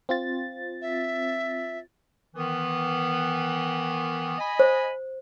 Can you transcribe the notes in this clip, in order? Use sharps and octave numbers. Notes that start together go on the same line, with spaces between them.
C4 F4 A6
E5
D#3 E3 B3
D#5 G#5 B5
C5